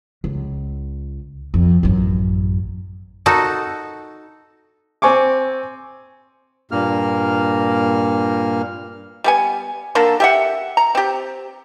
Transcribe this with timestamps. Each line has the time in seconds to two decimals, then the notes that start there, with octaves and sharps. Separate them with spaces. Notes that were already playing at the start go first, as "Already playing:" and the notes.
0.24 C#2
1.54 F2
1.83 A1 F#2
3.26 D#4 F#4 A4
5.02 C4 G#5 C#6 D6
6.71 G2 A#2 A#3 F6
9.24 G3 B3 G#5
9.95 D3 A#3 A4 A#4
10.20 G4 E5 F#5
10.77 A#5
10.95 C4 G4